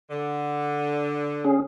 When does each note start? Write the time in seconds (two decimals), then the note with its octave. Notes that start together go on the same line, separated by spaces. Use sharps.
0.10 D3
1.44 C#4 G#4